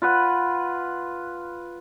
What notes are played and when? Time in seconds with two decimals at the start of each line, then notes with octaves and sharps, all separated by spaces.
0.02 F4 B4 F#5